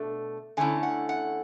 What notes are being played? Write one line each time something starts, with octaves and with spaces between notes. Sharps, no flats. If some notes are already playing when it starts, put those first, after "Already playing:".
Already playing: B2 A3 D4
D3 A3 C#4 E4 G#5
F#5
F#5